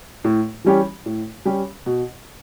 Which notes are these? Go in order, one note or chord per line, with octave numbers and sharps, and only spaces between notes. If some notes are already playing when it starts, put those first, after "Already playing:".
A2
E3 G3 C#4 G4
A2
G3 C#4 G4
B2